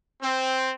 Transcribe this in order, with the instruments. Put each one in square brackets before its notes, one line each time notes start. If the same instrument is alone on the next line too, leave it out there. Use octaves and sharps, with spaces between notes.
[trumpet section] C4